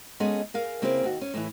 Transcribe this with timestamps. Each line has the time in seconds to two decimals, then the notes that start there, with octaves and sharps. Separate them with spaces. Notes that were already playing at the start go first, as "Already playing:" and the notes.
0.20 G#3 B3 C#4 D#4 G#4 A4
0.54 G#4 A#4 F5
0.82 C#3 A#3 C4 E4 G#4 F5
1.04 D#2 F#4
1.21 C#4
1.34 A2 D#3 E3